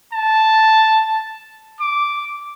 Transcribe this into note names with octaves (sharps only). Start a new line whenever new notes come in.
A5
D6